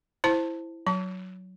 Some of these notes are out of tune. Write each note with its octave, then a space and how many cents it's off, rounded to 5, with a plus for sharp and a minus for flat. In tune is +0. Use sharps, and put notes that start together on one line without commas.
E4 +5 C5 +0 A5 +15
F#3 +0 A5 +20